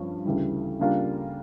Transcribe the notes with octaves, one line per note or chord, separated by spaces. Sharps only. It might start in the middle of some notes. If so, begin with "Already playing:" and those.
Already playing: G2 F3 C#4
D2 C#3 E3 G3
C#3 G3 A#3 D4 F4